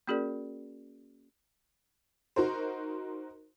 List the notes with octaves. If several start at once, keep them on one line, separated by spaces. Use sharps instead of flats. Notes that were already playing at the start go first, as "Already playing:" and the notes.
A#3 C#4 F#4 G#4 A#4 D5
D#4 F#4 A#4 C5